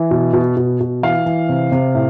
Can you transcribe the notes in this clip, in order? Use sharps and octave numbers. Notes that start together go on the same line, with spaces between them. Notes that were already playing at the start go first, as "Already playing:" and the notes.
Already playing: E3
B2
B2
B2
B2
E3 F5
E3
C3
C3
A2